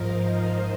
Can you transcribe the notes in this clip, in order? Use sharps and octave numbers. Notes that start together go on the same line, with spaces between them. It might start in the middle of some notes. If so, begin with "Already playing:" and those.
Already playing: G#2 F3 A#4 C5 D#5 F5